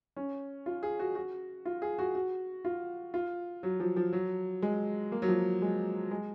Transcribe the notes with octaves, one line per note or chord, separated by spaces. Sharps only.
C#4
F4
G#4
F#4
F#4
F4
G#4
F#4
F#4
F4
F4
F#3
F3
F3
F#3
G#3
A#3
F#3
F3
G#3
G#3